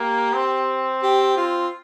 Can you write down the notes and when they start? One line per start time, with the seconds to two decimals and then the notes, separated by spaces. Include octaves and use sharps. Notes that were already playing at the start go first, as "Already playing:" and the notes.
Already playing: A#3 G4
0.34 C4
1.03 G4
1.37 F4